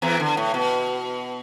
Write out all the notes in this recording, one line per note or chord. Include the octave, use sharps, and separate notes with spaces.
E2 E3
D3
A2
B2